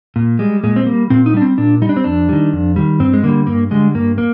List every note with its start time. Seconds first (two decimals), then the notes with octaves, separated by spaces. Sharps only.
0.16 A#2
0.39 G3 G#3
0.64 A#2 G#3
0.76 C4
0.86 G3 A#3
1.10 A#2 C4
1.26 D#4
1.34 G3 D4
1.42 C4
1.58 A#2 D4
1.82 G3 D#4
1.89 D4
1.97 C4
2.04 F2 D4
2.29 D#3 G3
2.53 F2
2.76 D#3 G3
3.00 G2 C4
3.13 G#3
3.23 D3 G3 A#3
3.47 G2 A#3
3.71 D3 G3 G#3
3.94 G2 A#3
4.18 A#3